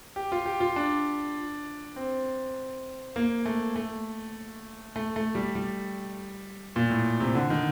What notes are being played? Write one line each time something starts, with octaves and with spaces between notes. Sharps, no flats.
G4
F4
G4
F4
D4
C4
A#3
A3
A3
A3
A3
G3
G3
A#2
A2
C3
D3
D#3